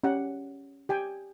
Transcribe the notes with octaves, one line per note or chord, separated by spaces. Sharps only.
C#4 G4 F#5
G4 G5 G#5